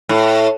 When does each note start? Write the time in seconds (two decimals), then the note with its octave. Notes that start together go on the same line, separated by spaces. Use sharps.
0.09 A2